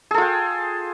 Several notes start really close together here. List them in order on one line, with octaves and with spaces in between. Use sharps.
G#4 A4 F4 G5